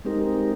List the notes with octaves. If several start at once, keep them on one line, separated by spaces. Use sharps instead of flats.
G#3 C4 D#4 G4 A#4